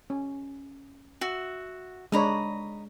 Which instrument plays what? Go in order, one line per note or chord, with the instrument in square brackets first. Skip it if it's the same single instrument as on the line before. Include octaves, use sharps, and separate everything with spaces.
[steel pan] C#4
[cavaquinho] F#4 E5
[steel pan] G#3 D4 C#5 [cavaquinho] D#5 A#5 B5